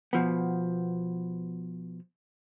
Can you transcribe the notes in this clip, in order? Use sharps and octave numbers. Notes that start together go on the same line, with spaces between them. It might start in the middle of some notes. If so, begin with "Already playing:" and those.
B2 F3 B3